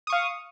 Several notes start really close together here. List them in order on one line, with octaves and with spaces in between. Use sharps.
D#6 C#6 F5